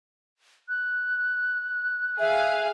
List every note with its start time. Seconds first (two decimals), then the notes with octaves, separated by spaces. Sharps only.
0.69 F#6
2.20 G#4 E5 F5